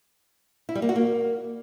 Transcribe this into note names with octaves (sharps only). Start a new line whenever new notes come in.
E4
G3
A#3
F#4
A#3